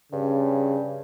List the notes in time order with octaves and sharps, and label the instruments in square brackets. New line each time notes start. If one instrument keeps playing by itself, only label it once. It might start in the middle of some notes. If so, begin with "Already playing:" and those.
[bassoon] G2 [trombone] C#3